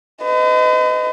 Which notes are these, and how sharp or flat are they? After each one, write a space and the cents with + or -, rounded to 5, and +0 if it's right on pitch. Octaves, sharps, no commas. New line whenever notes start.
B4 +40 D#5 +0